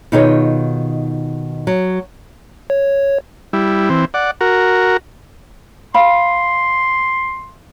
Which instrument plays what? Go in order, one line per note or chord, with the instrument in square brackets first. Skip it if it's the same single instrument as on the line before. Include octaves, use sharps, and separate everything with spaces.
[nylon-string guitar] B2 D#3 D#4 F4 G#4 C#5
F#3
[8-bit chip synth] C#5
[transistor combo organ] G3 E4
E3 C4
D5 F#5
F#4 A#4
[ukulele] F5 B5 [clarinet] C6